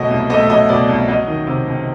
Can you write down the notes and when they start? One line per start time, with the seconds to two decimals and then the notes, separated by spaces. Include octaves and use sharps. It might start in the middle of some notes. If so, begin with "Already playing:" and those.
Already playing: B2 F#3 A3 D#5
0.11 C2
0.30 A3 D#5
0.40 E5
0.50 F#3 D#5
0.69 B2 D5
0.89 C2
1.08 F#3 D#5
1.28 D#3
1.47 C3
1.67 C#2